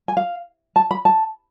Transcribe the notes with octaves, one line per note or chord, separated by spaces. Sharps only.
G#5
F5
A5
B5
A5